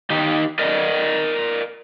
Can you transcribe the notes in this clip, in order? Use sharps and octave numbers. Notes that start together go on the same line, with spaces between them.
D#3 D#4 G4
A#4 D5 D#5